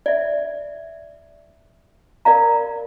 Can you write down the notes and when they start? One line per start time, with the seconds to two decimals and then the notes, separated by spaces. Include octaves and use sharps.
0.06 D5 E5
2.25 A#4 D5 F5 A#5